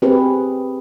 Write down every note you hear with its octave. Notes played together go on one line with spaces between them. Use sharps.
C4 G4 G#4 B4